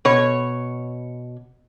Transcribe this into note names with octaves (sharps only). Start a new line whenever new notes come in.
B2 C#5